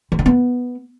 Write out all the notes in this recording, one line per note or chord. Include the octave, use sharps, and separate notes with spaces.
E3
D3
B3